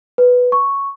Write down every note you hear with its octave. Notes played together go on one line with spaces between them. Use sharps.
B4
C#6